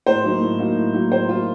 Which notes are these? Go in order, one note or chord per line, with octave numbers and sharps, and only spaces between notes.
A2 C5
F#3 A#3 D#4
A2
F#3 A#3 D#4
A2
F#3 A#3 D#4
A2 C5
F#3 A#3 D#4 F4